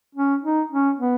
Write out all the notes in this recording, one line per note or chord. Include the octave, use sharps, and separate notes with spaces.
C#4
D#4
C#4
B3